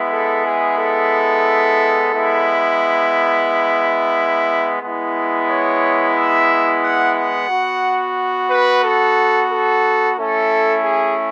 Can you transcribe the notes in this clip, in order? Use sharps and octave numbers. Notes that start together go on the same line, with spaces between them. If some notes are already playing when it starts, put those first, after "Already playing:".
Already playing: G#3 B3 E4
A4
G#4
A4
G#3 B3 E4
G#3 B3 E4
C#5
E5
F#5
F#5
B3 F#4
B4
A4
A4
A3 C#4 E4 A4
G#4